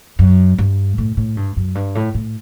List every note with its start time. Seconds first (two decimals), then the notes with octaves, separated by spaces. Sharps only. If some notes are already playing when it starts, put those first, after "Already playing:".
0.19 F#2
0.58 G2
0.98 A2
1.17 A2
1.37 G2
1.57 F#2
1.75 G2
1.95 A2
2.15 A2